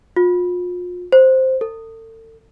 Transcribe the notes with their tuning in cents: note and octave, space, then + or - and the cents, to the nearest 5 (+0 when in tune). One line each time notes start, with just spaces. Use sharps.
F4 +35
C5 +0
A4 +40